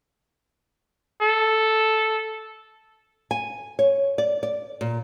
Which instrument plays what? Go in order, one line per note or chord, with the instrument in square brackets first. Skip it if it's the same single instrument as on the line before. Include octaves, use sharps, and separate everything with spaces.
[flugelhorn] A4
[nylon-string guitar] G#5
C#5
D5
D5
A#2